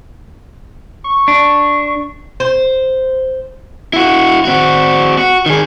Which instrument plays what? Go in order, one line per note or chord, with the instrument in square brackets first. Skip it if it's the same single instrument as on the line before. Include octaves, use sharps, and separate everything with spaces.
[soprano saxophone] C#6
[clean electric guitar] D4
[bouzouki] C5
[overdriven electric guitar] E4 F#4
C4 F#4
F#4
D#3 G#4